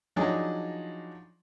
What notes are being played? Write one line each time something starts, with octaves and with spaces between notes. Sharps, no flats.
F3 F#3 D4 D#4 G#4